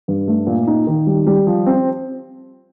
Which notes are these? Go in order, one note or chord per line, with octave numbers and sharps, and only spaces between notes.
G2
A3
A#2
D#4
D#3
G3
G3
F3
C4